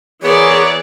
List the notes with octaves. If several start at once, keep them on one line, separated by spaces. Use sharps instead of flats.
E3 B3 G#4 A#4 C#5 D5